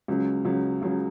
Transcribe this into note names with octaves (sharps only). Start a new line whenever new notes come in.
C#2 C#3 F#3
C#2 C#3 F#3
C#2 C#3 F#3